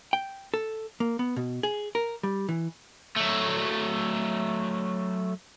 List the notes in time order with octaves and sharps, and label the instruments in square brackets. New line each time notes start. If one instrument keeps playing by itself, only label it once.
[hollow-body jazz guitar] G5
A4
A#3
B3
B2
G#4
A#4
G3
E3
[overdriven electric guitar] F#3 A3